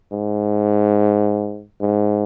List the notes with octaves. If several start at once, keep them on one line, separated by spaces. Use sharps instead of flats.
G#2
G#2